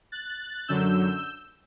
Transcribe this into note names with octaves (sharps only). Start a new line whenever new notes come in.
F#6 A6
F#2 D3 F#3 E6 G6